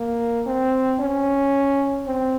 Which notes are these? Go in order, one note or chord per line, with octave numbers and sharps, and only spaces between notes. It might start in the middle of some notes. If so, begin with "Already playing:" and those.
Already playing: A#3
C4
C#4
C4